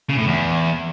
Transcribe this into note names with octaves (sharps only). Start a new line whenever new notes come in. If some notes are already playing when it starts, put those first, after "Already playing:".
C#3
A2
E2